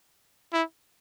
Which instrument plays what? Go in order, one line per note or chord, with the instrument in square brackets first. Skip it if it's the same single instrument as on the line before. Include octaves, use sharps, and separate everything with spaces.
[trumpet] E4